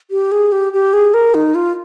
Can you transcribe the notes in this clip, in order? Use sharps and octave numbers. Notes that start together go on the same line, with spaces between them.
G4
G#4
G4
G4
G#4
A#4
D#4
F4